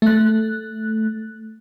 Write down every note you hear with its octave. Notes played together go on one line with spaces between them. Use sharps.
A3 F#6